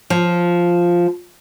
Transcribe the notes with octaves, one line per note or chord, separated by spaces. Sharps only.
F3